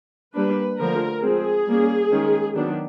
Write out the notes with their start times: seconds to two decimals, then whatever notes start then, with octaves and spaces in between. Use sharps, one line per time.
0.35 G3 A#3 D4 B4
0.79 D3 F3 A3 A#4
1.23 F3 G#3 C4 G#4
1.68 G3 A#3 C#4
2.11 D#3 G#3 C#4
2.55 D#3 F#3 B3 D4